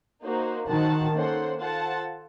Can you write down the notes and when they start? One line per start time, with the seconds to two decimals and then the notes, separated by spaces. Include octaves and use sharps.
0.23 A#3 D#4 F#4 C5
0.68 D#3 F#4 C5 F#5 A5
1.13 A#3 C#4 A4 C5 F#5
1.59 F4 A4 C5 F#5 A5